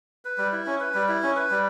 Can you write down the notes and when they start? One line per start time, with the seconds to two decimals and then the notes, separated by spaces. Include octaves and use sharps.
0.25 B4
0.38 G3
0.52 E4
0.66 C#4
0.80 B4
0.94 G3
1.08 E4
1.23 C#4
1.36 B4
1.51 G3